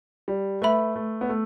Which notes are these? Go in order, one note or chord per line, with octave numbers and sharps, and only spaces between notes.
G3
A3 B4 E5 B5
A3
B3
A3